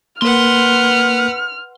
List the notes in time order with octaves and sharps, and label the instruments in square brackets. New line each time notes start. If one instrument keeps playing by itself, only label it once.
[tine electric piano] A#3 A#4 [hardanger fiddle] B4 F#5 [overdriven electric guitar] C6 [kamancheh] F6